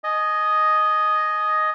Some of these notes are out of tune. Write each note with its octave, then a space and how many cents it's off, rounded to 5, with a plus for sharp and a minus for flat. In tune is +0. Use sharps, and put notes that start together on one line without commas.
D#5 +0 G#5 +30